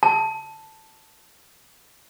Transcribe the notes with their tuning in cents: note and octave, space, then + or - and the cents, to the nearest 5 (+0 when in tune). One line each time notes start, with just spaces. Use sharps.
A5 +5